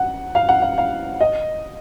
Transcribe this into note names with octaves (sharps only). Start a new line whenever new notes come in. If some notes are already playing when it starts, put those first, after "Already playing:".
Already playing: F#5
F5
F#5
F5
F5
D#5